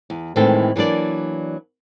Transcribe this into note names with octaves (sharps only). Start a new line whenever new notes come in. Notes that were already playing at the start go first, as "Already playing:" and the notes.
E2
A2 D#3 E3 G#3 C4 A4
E3 F#3 A#3 D4 D5